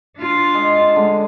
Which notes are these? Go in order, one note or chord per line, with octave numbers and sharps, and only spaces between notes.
D4 F4
G#3
D3 G#3